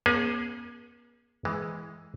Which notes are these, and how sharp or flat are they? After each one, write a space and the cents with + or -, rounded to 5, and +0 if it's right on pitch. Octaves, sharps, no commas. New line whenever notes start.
A#3 +45 C#4 -25 G#4 +0
E3 +0 G#3 +0